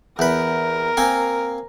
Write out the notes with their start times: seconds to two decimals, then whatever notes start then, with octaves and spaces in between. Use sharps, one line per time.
0.19 E2 A#4 B4
0.97 A#3 C4 G#5